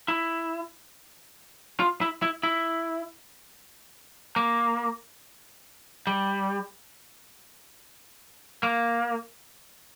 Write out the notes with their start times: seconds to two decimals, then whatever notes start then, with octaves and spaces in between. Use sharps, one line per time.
0.08 E4
1.80 F4
2.01 E4
2.22 E4
2.43 E4
4.36 A#3
6.07 G3
8.63 A#3